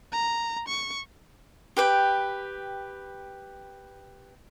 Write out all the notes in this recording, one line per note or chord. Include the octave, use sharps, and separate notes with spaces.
A#5
C#6
G4 B4 G5